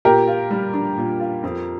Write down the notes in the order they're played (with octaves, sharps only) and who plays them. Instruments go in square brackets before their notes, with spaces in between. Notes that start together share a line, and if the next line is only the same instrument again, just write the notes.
[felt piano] A#2 [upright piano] G4 A#4
[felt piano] F4
G3
D4
A#2
F4
F2